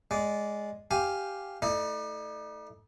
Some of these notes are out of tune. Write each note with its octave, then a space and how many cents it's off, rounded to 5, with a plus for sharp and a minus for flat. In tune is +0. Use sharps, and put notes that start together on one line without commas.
G#3 +0 D5 -15
G4 +0 F5 +0 G#5 +0
A3 -10 D#4 +40 D5 +35